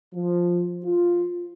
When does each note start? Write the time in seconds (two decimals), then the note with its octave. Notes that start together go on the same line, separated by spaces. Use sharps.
0.13 F3
0.83 F4